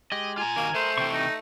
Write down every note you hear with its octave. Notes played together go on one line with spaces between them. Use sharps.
G#3 G4 D#5
F4 G#5 A#5
D#3 A#3 F#4 A#4
A3 C5 G#5 C6
C3 E3 G5 C#6
D#4